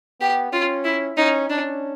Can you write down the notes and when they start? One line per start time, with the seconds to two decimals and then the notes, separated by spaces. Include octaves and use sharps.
0.20 B3 G4
0.52 C#4 F4
0.85 E4
1.17 C#4 D#4
1.49 C#4 D4